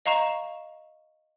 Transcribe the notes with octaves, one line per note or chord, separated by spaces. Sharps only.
D#5 F5 A#5 C#6 E7